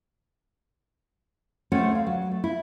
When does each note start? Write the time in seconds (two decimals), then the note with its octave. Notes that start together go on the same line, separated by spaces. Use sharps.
1.72 A3 C4 C#4 C#5 F#5
1.91 D2 F5
2.06 F#3
2.31 A3
2.44 E4